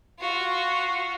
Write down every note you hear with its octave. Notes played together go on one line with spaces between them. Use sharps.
F4 F#4